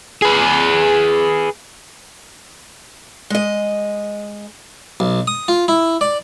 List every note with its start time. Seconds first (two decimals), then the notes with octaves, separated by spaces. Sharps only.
0.22 G#4 B4
3.30 G#3 D#5
5.00 B1
5.27 D#6
5.48 F4
5.68 E4
6.01 D5